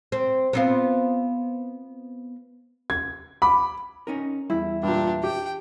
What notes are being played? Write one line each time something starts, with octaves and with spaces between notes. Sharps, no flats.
C4
B3 C4 F4
G#6
B5 D6
C#4 D#4 A#4
E2 G3 E4
G2 A#2 D4 G4
G4 G5